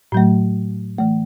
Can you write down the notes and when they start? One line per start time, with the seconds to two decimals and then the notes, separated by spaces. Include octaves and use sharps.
0.12 A2 F#3 A3
0.98 E3 A3